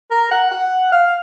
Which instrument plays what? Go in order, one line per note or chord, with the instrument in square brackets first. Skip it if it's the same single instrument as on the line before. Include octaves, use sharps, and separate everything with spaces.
[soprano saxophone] A#4
F#5
F#5
F5